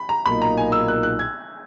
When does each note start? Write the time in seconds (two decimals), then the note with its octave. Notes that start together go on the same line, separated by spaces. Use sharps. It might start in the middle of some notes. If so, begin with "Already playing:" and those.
Already playing: B5
0.09 A#5
0.25 B1 A#2 A#3 D#4 B5
0.42 A#5
0.57 G#5
0.72 E6
0.88 F#6
1.03 F#6
1.19 G#6